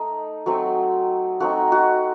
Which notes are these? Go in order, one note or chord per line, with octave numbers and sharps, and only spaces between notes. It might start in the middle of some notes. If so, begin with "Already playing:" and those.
Already playing: A3 D#4
F#3 A3 C4
A3 C4 D#4 F#4
F#4